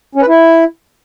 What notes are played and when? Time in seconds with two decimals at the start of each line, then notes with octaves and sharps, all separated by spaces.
0.15 C#4
0.22 B4
0.28 E4